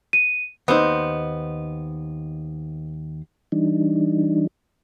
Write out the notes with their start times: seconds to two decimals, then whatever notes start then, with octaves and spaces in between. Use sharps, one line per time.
0.13 D#7
0.68 D#2 B3 C4 D#4 C5
3.52 E3 G3 D4 D#4